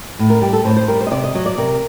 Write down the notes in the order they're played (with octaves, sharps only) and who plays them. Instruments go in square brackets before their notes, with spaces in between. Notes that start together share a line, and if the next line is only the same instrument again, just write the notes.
[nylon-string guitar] A2
A#4
G3 G4
A4
A2 C5
C5
G3 A#4
C5
D#5
C3 D5
D#5
F#3 D#5
D5
C3 A#4